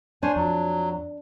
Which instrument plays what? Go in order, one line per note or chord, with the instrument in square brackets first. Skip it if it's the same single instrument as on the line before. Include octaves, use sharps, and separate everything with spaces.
[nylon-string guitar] D4 [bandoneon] C5 C#5 G#5
[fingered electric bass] F2 [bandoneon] F#3